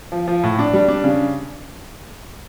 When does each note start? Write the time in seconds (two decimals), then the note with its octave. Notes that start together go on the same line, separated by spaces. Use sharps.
0.12 F3
0.27 F3
0.43 A2
0.59 D4
0.73 G3
0.88 D4
1.04 C#3